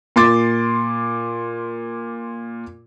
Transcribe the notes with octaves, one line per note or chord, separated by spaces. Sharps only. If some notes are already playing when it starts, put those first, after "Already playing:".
A#2 C6 D6 A6